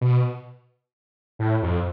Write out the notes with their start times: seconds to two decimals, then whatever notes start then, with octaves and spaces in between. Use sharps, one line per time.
0.01 B2
1.39 A2
1.62 F2